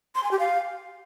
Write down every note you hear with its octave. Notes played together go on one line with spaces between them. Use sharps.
C6
G#5
G4
F5